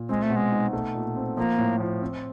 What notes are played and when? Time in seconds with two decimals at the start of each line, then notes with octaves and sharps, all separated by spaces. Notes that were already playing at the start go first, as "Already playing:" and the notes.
Already playing: A#2
0.09 G#3 C4
0.22 A3
0.30 B2
0.36 G#3
0.52 D#4
0.73 A3
0.95 A#2
1.17 C4
1.37 F3 A#3
1.58 A2
1.80 F3
2.02 C4